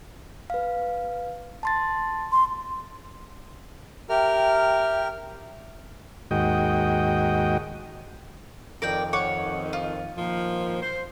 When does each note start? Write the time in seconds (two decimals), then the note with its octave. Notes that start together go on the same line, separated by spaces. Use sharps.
0.50 B4 F5
1.63 A5 C6 A6
2.32 C6
4.09 G4 A#4 E5 G5 F6
6.31 D#2 G#2 F#4 D#5 G5
8.82 F2 D#3 A#4 D5 G5
9.13 C#5 F#5 D6
9.73 F4
10.18 A#2 D#3 F3
10.82 C5